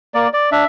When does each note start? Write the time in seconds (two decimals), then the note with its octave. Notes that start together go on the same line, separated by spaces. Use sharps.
0.14 A#3 D5
0.33 D5
0.52 D4 E5